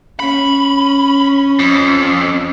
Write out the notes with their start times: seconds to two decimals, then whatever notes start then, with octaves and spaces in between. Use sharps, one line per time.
0.20 C#4 B5
1.59 F2